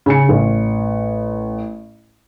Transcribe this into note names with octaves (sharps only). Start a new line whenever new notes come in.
C#3 G#5 C#7
A1